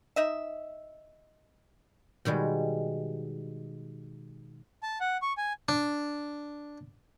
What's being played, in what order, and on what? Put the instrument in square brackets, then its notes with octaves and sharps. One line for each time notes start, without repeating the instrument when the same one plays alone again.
[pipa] D#4 D#5 E5
[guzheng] B2 D#3 G3 G#3
[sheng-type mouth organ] A5
F#5
C#6
G#5
[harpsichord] D4